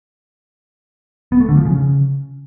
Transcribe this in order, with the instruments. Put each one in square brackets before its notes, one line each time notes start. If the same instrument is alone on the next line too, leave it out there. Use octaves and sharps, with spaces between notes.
[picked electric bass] B3
A3
D3
F3
C#3